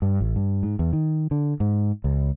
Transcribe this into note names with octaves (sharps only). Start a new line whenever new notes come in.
G2
A1
G2
G#2
E2
D#3
D3
G#2
C#2